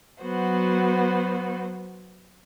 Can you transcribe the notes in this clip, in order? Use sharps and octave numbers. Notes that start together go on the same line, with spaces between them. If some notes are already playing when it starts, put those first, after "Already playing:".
F#3 B3 F#4 C5